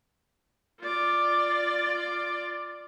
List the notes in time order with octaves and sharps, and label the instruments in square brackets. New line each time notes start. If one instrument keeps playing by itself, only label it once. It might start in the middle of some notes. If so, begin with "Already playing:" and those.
[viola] F4 D5